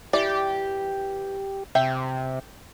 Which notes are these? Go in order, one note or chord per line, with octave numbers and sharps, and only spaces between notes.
E3 G4 D5
C3 E5 G5